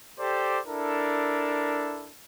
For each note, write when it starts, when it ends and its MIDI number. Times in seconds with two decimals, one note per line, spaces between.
0.19 0.59 67
0.19 0.59 69
0.19 0.59 72
0.19 0.59 74
0.67 2.11 62
0.67 2.11 64
0.67 2.11 69
0.67 2.11 70